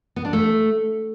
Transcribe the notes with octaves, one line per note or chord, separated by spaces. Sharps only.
B3
D4
A3